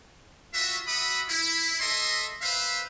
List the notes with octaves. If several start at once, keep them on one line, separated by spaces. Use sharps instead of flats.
F4 F#4 E5
F#4 E5 B5 D#6
E4
A4 D#5 E5 C6
B4 C5 E5 F5